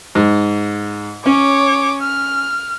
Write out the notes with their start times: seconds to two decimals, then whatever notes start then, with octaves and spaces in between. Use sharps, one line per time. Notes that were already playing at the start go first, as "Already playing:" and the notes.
0.15 G#2
1.26 C#4 C#5 D6
2.02 F6